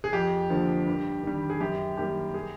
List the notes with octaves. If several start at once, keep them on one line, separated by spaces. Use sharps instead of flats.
G#4
F2 G4
D3 F3 A#3
G2
D#3 G3
G#4
F#2 G4
D#3 G3 A#3 G4
G#4